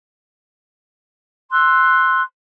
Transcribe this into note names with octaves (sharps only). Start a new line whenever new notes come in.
C6 E6 F#6